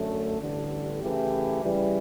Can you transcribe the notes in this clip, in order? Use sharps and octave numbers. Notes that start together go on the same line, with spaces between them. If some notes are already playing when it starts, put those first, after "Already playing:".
Already playing: F#2 D3 A3 C#4
A1 G2 D3
C#3 E3 A3 E4 G4
C#3 E3 G3